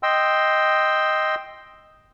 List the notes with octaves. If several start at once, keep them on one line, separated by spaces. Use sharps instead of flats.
D#5 G5 C6 E6